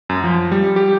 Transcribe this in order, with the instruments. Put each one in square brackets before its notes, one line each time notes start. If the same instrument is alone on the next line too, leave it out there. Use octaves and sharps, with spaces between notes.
[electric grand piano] F#2
F3
G3
G4